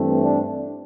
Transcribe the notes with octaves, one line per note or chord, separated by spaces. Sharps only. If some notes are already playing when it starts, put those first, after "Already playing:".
Already playing: G2 E3 A3 C4
D4